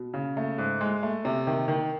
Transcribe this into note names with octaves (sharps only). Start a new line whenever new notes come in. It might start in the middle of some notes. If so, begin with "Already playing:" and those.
Already playing: B2
C#3
A3
G#2
G#3
A3
C3
D#3
D#3